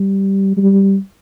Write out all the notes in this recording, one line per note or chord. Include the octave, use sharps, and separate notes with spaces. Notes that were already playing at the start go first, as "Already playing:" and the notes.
Already playing: G3
G3